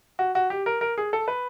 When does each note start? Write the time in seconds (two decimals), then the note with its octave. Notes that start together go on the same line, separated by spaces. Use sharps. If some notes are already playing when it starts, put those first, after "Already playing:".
0.19 F#4
0.35 F#4
0.50 G4
0.66 A#4
0.81 A#4
0.98 G#4
1.13 A4
1.28 B4